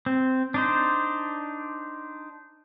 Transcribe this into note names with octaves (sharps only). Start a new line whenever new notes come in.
C4
D4 D#4 C5